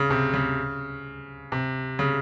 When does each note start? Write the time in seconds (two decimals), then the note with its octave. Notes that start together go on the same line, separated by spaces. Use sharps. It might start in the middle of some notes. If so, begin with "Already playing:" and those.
Already playing: C#3
0.10 C3
0.33 C#3
1.52 C3
1.99 C#3